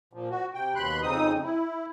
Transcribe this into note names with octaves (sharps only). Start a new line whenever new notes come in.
A#2 F3
F#4
C3 G5
D#2 B2 B5 C6 F#6
F2 C#3 C4 D#4 D#6
E4